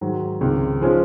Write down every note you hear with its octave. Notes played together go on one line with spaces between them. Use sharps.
G#2 D#3 F#3
C#2 C3 D#3
F3 G#3 C#4 F4